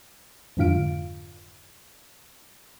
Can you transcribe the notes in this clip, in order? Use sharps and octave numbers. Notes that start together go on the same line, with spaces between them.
F2 G#2 D3 F4 F5 D7